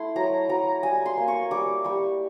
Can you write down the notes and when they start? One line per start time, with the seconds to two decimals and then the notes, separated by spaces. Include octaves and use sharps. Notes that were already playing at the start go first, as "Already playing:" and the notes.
Already playing: A3 E4 C6
0.16 F#3 A#5
0.49 F#3 A#5
0.83 G3 G#5
1.06 C6
1.17 A#3
1.28 C#6
1.51 G3 D6
1.84 G3 C#6